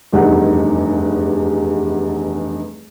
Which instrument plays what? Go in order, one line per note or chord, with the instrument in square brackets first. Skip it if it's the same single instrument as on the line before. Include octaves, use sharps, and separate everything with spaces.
[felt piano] F1 E2 G2 D#4 F#5